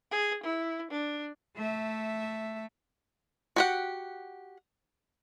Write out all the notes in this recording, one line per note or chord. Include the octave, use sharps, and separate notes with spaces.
G#4
E4
D4
A3 E5
F#4 G4 F#5